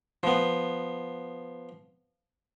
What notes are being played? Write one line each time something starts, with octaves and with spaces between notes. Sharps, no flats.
F3 B3